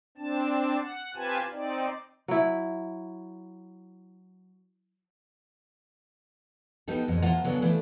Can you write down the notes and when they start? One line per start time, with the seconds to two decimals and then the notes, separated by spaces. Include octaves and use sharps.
0.18 C4 D4 A5
0.82 F#5
1.15 C4 F4 G4 B4 G#5 A5
1.52 C4 D#4 D5
2.28 F#3 E4
6.88 G3 B3 D#4 A4
7.08 F2 A#2
7.22 F3 A#3 F4 E5 F#5 A#5
7.44 C#3 F#3 B3 D4 F4 A4
7.62 E3 F3 A3 D4 E4